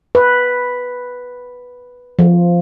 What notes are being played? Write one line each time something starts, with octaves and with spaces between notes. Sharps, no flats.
B4
F3